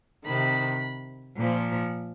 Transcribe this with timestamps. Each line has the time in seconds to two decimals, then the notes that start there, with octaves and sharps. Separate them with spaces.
0.25 C3 D#3 B5
1.36 A#2 F3